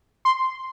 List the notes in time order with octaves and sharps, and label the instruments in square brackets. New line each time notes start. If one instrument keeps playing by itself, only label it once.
[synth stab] C6